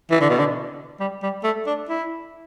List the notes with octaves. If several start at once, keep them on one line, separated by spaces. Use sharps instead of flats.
E3
D3
B2
D3
G3
G3
A3
D4
E4